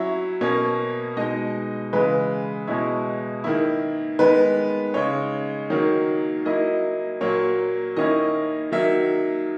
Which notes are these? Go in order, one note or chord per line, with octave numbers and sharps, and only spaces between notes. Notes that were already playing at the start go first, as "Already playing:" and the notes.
Already playing: F#3 C#4 E4 E5
B2 A#3 C#4
B2 G#3 D#4 D#5
C#3 E3 G#3 B4
B2 G#3 C#4 E4
D#3 A#3 E4
D#3 G#3 B3 B4
C#3 G#3 D#4 C#5
D#3 F#3 A#3 C#5
F#3 A#3 E4 D#5
A#2 F#3 A#3 C#5
D#3 A#3 C#4 E4 D#5
D#3 F#3 A#3 E5